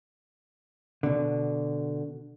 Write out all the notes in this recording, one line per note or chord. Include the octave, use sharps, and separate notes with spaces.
B2 D3